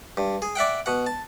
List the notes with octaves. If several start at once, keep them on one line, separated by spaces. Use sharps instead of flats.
G2
G#4
D5 E5 F#5 G5
B2 F#5
A5